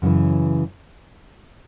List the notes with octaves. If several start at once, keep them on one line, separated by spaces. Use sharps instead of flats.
F#2 C#3 E3